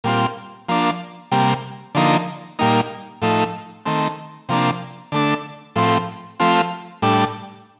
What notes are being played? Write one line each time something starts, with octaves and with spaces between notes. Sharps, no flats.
A#2 G3 C4 F4
F3 A#3 D4
C3 G3 A#3
D3 F3 A#3 D#4
A#2 G3 A#3 D#4
A2 F3 A3 D#4
D#3 A3 C4
C3 F3 A#3 D4
D3 A3 D4
A2 F3 C4
F3 A3 C4 F4
A2 G3 D4